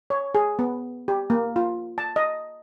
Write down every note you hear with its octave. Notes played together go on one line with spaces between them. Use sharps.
C#5
G#4
B3
G4
A#3
F4
A5
D#5